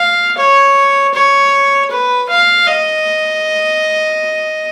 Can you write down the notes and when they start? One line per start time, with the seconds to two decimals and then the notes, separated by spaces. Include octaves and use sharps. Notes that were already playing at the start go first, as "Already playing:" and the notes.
Already playing: F5
0.38 C#5
1.14 C#5
1.91 B4
2.29 F5
2.67 D#5